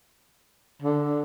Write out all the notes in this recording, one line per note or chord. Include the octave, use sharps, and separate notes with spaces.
D3